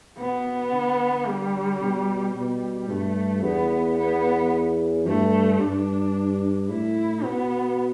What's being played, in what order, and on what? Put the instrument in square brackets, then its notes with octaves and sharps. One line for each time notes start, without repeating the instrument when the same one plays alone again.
[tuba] B2 [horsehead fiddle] B3
[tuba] D3
[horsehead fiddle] G3
[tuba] B2
[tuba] B2 [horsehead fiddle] G3
[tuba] G2 [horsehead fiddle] A3
[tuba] E2 [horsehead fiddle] B3
[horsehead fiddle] B3
[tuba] G2 [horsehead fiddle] A3
[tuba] G2 [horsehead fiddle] D4
[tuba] A2 [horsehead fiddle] E4
[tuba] B2 [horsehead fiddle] B3